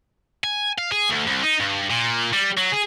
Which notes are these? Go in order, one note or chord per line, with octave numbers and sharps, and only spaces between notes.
G#5
F5
G#4
D2
C2
D#4
G2
A#2
G3
F#3
G#4